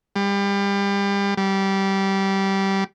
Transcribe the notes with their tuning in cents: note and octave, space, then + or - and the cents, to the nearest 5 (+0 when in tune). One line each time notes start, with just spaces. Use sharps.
G3 +30
G3 -15